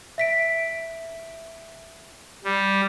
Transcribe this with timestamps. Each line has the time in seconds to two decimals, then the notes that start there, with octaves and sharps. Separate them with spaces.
0.18 E5 B6 D7
2.44 G3